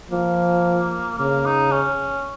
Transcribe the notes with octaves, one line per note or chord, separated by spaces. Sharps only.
F3 A#3
C#3 A#3
D#4
C#4